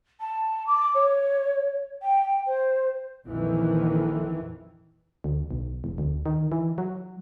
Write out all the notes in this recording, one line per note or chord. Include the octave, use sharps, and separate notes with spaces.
A5
D6
C#5
G5
C5
A#1 F2 D#3 E3
D2
B1
E1
D2
D#3
E3
F#3